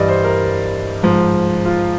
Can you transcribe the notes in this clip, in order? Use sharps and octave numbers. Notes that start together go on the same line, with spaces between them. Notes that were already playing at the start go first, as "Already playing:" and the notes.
Already playing: G2 E3 G3 D5 D#5
C5
A#4
G#2 F3
F4